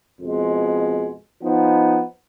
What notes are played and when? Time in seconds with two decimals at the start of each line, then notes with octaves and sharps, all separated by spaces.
0.20 F2 B2 G#3
1.42 F3 B3 D#4